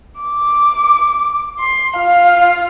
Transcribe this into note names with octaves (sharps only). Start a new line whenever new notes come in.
D6
C6
F4 F5